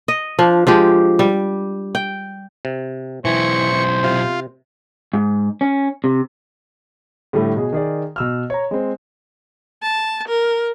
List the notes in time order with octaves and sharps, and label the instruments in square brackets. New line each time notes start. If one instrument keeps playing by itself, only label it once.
[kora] D#5
F3 D4
F3 G#3 G4
G3
G5
[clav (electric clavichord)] C3
[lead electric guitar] B1 E4 [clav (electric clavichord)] E3 [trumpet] C5 [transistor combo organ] C#6
[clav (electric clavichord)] C3 [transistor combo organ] F4
[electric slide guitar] G#2
C#4
C3
[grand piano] A2 D3 G3 A3
B2 G#4
D#3 G#4 D5
B2 E6 F6
C#5 A#5
G#3 C4
[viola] A5
A#4